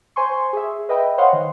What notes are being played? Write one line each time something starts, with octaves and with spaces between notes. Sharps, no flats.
C5 G#5 C6 C#6
G#4 E5
B4 D#5 E5 G5 B5
C5 C#5 D#5 F5 F#5 C6
D#3